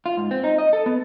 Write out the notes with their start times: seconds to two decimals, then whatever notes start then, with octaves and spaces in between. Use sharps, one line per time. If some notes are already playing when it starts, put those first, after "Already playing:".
0.06 F4
0.17 G#2
0.31 C4
0.44 D#4
0.58 D#5
0.73 A4
0.86 B3